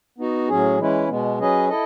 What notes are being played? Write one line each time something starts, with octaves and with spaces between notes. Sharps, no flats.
B3 D#4 F#4
A2 F#3 C#4 G#4
E3 G#3 C#4 E4 B4
B2 G#3 B3
F#3 C#4 G#4 B4 D#5
E4 A4 D#5